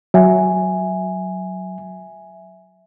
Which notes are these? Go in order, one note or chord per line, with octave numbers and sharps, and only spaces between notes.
F#3 E5 G#5